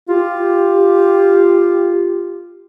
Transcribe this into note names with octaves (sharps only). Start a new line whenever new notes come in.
F4 G4